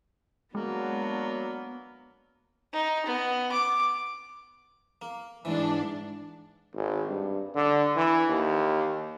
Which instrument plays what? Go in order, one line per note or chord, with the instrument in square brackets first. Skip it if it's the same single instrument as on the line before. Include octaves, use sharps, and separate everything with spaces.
[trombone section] F#3 D4 [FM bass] G#3 [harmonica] A#3 [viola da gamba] B3
[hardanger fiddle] D#4
B3
D6
[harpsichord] A#3
[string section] G#2 D4 [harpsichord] E3
[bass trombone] G#1
G2
D3
E3
D#2